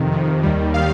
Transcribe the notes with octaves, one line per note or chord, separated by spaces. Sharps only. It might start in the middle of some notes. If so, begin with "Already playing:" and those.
Already playing: F2 C3 D#3
F2 C3 D#3
D#2 D#3 G3
D#3 G3 F5